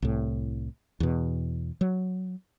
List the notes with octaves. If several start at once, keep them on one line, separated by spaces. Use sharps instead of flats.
C2 A2
E2 B2
F#3